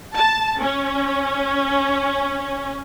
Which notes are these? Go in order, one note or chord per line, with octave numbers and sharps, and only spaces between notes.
A5
C#4